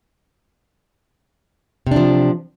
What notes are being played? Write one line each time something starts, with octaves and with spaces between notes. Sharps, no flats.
C3 F3 D4